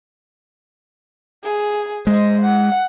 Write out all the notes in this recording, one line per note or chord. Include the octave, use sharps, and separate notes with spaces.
G#4
G#3 C5 D#5
F#5